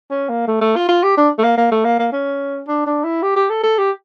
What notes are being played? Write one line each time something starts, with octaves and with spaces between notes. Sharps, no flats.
C#4
A#3
A3
A3
F4
F4
G4
D4
A3
A#3
A#3
A3
A#3
A#3
C#4
D4
D4
E4
G4
G4
A4
A4
G4